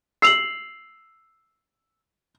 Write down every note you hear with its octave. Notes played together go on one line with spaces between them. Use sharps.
E6 C7 F7 F#7